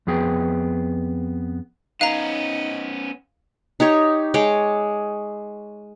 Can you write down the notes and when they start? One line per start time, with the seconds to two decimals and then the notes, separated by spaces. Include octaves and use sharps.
0.07 F2 B3 G#4 G5
2.01 B3 C#4 D#4 F5 A#5
3.80 D#4 G4 C#5 C#6
4.34 G#3 C#5 D6